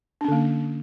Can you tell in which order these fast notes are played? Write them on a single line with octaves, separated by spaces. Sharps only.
D4 C#4 D3 A#3